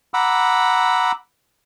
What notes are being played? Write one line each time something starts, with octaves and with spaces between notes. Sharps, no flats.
F#5 A#5 B5 D6 E6